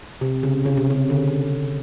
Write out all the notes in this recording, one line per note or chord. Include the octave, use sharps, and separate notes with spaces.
C3
C#3
C#3
C3
C#3
D3